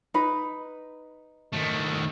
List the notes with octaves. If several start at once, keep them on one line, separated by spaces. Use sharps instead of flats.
D#4 B4 B5
D#3 A3